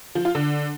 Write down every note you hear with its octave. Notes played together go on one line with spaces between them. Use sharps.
F3
F4
D3